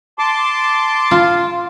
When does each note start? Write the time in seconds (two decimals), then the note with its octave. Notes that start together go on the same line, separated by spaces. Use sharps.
0.19 A5 C6 D6
1.11 F4